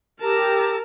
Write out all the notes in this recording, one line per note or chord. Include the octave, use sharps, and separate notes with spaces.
G4 A#4 A5 A#5 E6